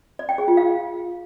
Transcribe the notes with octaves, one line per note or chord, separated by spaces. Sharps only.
D5
G5
G#4
F4
F5